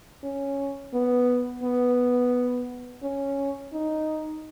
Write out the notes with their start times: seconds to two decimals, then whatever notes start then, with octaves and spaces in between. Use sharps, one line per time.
0.23 C#4
0.94 B3
1.64 B3
3.03 C#4
3.73 D#4